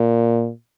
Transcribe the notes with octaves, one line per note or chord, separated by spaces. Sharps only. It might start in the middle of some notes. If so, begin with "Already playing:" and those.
Already playing: A#2